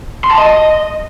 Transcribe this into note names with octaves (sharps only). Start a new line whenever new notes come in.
C6
A5
D#5